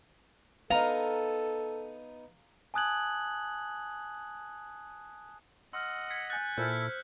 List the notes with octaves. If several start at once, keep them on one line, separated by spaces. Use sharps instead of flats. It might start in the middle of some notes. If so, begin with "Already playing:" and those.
B3 D#4 A4 F5 A#5
G#5 A5 D#6 F#6 G#6 F#7
D#5 F#5 C6 E6 F6
G#6 B6 C#7
G#5 F#6 G6 A6
A#2 E4 A4 C5 F6 G6